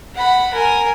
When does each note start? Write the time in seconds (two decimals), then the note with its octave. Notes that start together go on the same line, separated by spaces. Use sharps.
0.15 F#5 B5
0.53 A#4 G#5